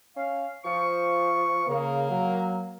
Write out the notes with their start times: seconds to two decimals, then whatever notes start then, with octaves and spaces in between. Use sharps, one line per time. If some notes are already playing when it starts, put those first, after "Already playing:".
0.16 C#4 F5
0.64 F3 C#6
1.68 C#3 A#3
2.10 F#3